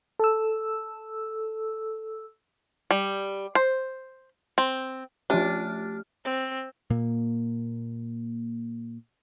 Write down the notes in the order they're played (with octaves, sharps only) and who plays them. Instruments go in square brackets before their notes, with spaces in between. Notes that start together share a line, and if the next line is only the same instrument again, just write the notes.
[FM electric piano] A4 E6
[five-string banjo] G3
C5
C4
[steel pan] F3 C#4 [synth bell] A3 G4 F6 [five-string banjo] D4
[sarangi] C4
[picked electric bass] A#2 A#3